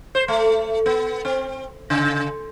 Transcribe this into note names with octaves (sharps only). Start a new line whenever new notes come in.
C5
A3
B3
C4
C#3